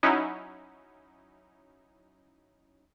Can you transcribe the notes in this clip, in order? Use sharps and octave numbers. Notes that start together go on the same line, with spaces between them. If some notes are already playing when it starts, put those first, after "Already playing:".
F#3 C#4 D#4 E4